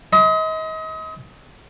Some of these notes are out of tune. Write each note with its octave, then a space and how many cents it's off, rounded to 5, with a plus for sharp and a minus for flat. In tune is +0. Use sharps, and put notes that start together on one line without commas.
D#5 +35 C6 -35